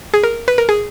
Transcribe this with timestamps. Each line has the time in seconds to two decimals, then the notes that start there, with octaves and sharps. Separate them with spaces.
0.14 G#4
0.23 A#4
0.48 B4
0.58 A#4
0.69 G#4